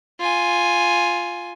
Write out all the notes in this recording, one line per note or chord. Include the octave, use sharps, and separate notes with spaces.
F4 G#5